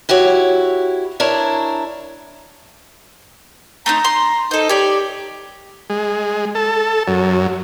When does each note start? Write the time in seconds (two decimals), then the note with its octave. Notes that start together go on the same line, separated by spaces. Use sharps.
0.09 E4 F#4 G4 C#5
1.20 D4 E4 A#4 C#5
3.86 A3 C4 D#4 A#5
4.04 C6
4.51 D#4 A4 C5
4.69 G4 C#5 D5
5.90 G#3
6.55 A4
7.08 F#2